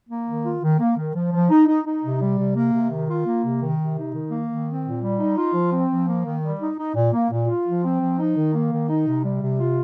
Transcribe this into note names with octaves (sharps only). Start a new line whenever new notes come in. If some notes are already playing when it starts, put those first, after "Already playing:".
A#3
D#3
F4
D#3
A#3
D#3
F3
F3
D#4
D#4
D#4
C3
G3
C3
A#3
C3
D#3
F4
A#3
C3
D#3
C3
D#4
D#3
A#3
D#3
C4
A#2
G3
D#4
F4
F3
C4
F3
A#3
D#3
G3
D#4
D#4
A#2
A#3
A#2
F4
F3
C4
F3
D#4
D#3
A#3
D#3
D#4
C3
G3
C3
F4